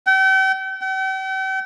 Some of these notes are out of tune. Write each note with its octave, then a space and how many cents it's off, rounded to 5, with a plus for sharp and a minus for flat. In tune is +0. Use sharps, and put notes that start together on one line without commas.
G5 -40
G5 -45